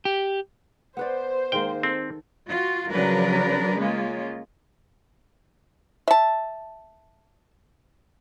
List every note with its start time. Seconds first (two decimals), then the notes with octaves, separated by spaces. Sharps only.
0.05 G4
0.97 B3 B4 C5 D5
1.52 D#3 G#3 A#3 G5
1.83 C4 A4
2.49 F4 F#4
2.91 C#3 F3 F#3 D4 A#4 B4
3.79 G#3 A#3 C#4 F4
6.08 E5 A5